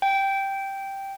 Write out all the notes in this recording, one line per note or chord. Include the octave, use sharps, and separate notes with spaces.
G5